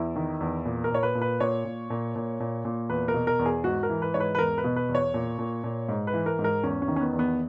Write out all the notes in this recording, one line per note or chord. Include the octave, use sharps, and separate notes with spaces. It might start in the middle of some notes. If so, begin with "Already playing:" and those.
Already playing: E2 E4
D#3
E2
A#2
A#4
A#2 C#5
B4
A#2
B4
A#2 C#5
A#2
A#2
A#2
A#2
A#2
E2 B4
A#4
B2
A#4
E2
G#4
G#2 F#4
A#4
E3
B4
G#2 C#5
B4
B4
E2 A#4
B4
B2
B4
E2
C#5
A#2
A#2
A#2
G#2
B4
E3
A#4
G#2
A#4
E2 C#4
C#4
D#3
C#4
B3
E2
B3